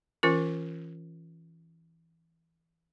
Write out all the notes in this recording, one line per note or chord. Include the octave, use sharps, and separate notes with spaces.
E3 C#4 F4 A#4